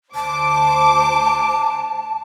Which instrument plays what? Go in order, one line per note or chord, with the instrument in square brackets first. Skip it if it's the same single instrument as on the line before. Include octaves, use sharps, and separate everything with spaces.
[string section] D2 C5 D6 [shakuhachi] A5